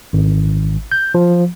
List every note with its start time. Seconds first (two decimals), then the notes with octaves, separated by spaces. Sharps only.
0.13 G#1
0.92 G6
1.15 F3